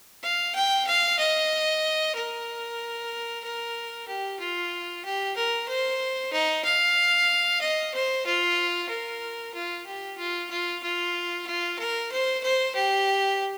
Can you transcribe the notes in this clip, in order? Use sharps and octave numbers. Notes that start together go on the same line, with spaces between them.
F5
G5
F5
D#5
A#4
A#4
G4
F4
G4
A#4
C5
D#4
F5
D#5
C5
F4
A#4
F4
G4
F4
F4
F4
F4
A#4
C5
C5
G4